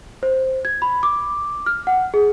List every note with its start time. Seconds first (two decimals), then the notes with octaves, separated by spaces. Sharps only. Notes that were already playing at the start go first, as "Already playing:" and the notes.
0.23 C5
0.65 G#6
0.82 B5
1.03 D6
1.66 F6
1.87 F#5
2.14 G#4